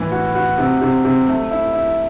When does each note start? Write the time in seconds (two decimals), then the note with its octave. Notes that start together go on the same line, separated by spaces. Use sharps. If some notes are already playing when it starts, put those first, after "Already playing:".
Already playing: A2 E3
0.11 F#4
0.35 F#4
0.58 C3
0.81 C3
1.05 C3
1.28 A3
1.51 E4
1.73 E4